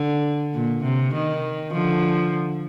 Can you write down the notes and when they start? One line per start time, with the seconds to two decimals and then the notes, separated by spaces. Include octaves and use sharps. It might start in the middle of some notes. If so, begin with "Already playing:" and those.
Already playing: D3
0.54 A#2
0.84 C3
1.14 D#3
1.72 D3 F3